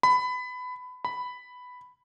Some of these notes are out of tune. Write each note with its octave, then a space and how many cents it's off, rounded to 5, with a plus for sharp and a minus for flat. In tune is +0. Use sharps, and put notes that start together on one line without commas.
B5 +20
B5 +5